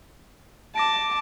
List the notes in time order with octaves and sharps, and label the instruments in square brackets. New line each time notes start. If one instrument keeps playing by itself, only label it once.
[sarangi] A5 [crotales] D6 A#6 D7